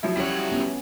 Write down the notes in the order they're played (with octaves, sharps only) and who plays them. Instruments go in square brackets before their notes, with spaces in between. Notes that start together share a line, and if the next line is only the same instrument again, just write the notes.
[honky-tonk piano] F3 F#3 E4
[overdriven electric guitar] G3 F#5 [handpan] C#4 C#5
[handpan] B3 C#4